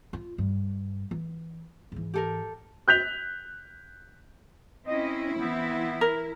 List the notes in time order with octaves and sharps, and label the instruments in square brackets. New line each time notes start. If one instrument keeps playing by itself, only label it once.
[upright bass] F4
G2
E3
G#2 E3
[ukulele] G4 A4 A#4
[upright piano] F#6 G6 B6 F7
[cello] C4 C#4 [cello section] E4 [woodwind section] D#5
[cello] E3 [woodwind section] B3 C4
[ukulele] A#4